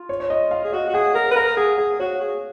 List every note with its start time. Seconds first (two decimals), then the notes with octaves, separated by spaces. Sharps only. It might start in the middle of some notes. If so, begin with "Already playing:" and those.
Already playing: F4
0.09 C#5
0.20 C#5
0.30 D#5
0.51 F5
0.64 G#4
0.73 F#4 D#5
0.89 F#4
0.94 G#4 F#5
1.15 A#4
1.31 B4
1.36 A#4 F5
1.57 G#4 F#5
1.78 G#4 F5
1.99 F#4 C#5
2.20 G#4